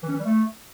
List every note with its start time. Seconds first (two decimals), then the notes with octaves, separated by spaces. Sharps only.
0.03 E3
0.09 C#4
0.14 E3
0.19 G3
0.25 A3